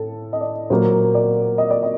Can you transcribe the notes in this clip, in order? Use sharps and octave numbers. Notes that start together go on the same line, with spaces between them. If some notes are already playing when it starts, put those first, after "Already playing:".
Already playing: A2 A4
D#5
D5
A#2 F#3 A#3 C5
D5
D#5
D5
D#5